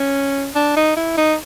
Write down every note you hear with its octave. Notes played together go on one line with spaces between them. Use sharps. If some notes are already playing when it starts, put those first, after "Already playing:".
Already playing: C#4
D4
D#4
E4
D#4